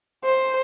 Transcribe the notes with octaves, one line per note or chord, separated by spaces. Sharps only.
C5